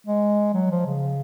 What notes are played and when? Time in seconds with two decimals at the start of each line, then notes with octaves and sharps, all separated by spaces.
0.07 G#3
0.54 F#3
0.71 F3
0.86 C#3